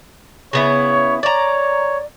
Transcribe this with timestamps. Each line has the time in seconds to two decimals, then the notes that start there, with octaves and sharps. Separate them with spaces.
0.53 C#3 B3 E4 C#5
1.23 C#5 D5 A#5